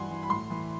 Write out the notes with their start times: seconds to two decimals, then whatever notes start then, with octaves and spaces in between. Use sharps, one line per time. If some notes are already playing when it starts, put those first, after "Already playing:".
Already playing: G2 E3 F#5 G#5 C6
0.11 E3
0.23 B5
0.30 A2 C6
0.50 E3